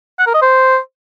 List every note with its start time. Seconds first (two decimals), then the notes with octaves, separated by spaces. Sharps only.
0.19 F#5
0.27 A#4
0.34 D#5
0.42 C5